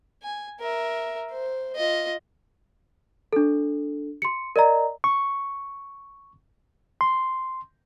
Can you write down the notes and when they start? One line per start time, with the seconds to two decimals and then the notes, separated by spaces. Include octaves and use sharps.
0.23 G#5
0.60 A#4 E5
1.31 C5
1.76 F4 D#5
3.33 D4 A4
4.22 C6 C#7
4.56 A#4 D5 D#5 A#5
5.04 C#6
7.01 C6